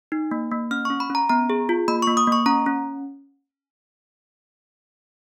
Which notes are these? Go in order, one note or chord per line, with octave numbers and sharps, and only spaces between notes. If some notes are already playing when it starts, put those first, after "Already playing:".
D#4
A#3
A#3
C#4 F6
C#6
C#4
B5
C#4 A#5
B3 A#5
G#4
F4
A#3 B5
C#6
A#3
D#6
A#3
C#6
C#4 A#5
C#4